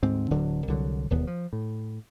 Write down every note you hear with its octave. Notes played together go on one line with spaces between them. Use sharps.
D2 G#2 C4
D1 D3 F#3
C2 D3 F#3
E1 D#2 B3
F3
A2